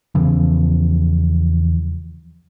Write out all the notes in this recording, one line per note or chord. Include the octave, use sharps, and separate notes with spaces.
E2 C#3 E3 F3